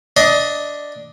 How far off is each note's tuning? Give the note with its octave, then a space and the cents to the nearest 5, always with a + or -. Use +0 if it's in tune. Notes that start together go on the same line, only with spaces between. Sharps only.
D4 +0 D#5 +15